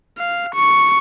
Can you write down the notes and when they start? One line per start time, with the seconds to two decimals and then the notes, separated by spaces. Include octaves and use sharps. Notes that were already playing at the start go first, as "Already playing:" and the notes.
0.18 F5
0.55 C#6